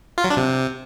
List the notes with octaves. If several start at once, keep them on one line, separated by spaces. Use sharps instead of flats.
F4
F#3
D4
C3